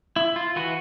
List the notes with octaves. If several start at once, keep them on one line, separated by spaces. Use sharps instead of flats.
E4
F4
E3 F#4 B4